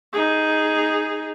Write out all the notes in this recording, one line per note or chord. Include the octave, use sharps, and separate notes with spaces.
D#4 G#4